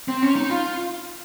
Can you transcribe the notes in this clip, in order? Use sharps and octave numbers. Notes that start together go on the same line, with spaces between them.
C4
C#4
D#4
F4